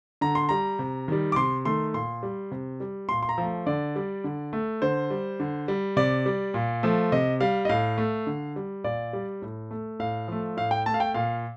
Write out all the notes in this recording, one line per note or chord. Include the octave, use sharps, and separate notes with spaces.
D3 A#5
C6
G3 A#5
C3
D#3 G3
D6
C3 C6
D#3 A3 C6
A#2 C6
G3
C3
G3
A#2 C6
C6
A#5
F3 A3
D3 D5
G3
D3
A3
D3 C5
G3
D3
G3
C3 D5
G3
A#2
F3 A3
C3 D#5
G3 F5
D#5
A2 F5
A3
D3
G3
A#2 D5
G3
A2
A3
A2 F5
F3 A3
A2 F5
G5
A3 A5
F5
G5
A#2 F5